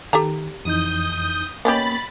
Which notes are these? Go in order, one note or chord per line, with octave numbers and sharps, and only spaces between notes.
D#3 G4 A4 A#5
F2 E3 D#4 D#6 G6
A#3 B3 C#4 G4 C#5 D#5 B5 A6